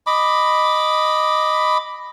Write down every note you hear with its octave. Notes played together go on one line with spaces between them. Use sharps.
D#5 B5 D6